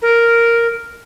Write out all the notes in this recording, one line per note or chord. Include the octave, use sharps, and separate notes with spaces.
A#4